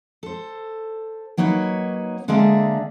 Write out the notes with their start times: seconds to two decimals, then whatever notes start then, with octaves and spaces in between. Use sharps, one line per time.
0.23 A4 C5
1.37 F#3 A#3 D#4 B4 C#5
2.28 D3 G#3 A#3 G#4 D5 E5